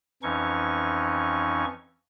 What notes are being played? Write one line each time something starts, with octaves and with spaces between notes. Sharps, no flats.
F2 E3 C#4 D#4 C#6